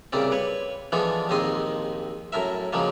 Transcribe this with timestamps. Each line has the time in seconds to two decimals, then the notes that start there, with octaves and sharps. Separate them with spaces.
0.13 C2 A#2 C#3 C4 D5
0.32 B4 C#5
0.92 E3 F3 G#3 B3 D4 A4
1.29 A#1 D#2 G#2 C4 D#5 C6
2.32 F#2 A2 A#4 E5
2.73 C#3 F3 F#3 G#3 A#3